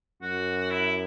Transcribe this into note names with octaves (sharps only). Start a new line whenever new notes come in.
F#2 F#4
E4